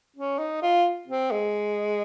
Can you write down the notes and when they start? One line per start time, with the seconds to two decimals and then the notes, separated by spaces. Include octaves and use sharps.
0.16 C#4
0.39 D#4
0.62 F4
1.08 C4
1.31 G#3